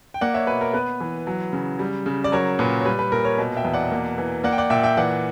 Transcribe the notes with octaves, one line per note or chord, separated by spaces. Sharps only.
G5
A#3 D5 F#5
C#5 E5
B2 B4
A#4
B3 B4
E3
F#3
C#3
G3
C#3
D5
F#3 A#4 C#5
A#2 B4
C#5
G3 B4
B4
A#2 A#4
A#4 C#5
B2
E5 G5
E2
D5 F#5
A#3
E3
A#3 D5 F#5
G5
D5 F#5
A#2 E5 G5
E5 G5
E3 D5 F#5